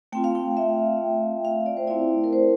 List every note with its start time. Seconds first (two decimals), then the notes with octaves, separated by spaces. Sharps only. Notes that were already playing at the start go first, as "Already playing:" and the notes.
0.12 A3 C4 F4 G5
0.24 F5
0.35 G5
0.57 E5
1.45 F5
1.66 D5
1.77 C5
1.87 A3 C4 E4 D5
2.24 A#4
2.33 C5